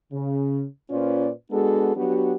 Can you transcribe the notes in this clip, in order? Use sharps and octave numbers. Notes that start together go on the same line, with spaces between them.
C#3
A#2 C#4 F4 B4 C5 D5
G#3 B3 D4 F#4 G#4 A4
F#3 B3 D4 F#4 G4